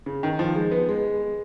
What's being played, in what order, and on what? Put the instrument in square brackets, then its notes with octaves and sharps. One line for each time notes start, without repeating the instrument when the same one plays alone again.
[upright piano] C#3
D#3
F3
G#3
B3
G#3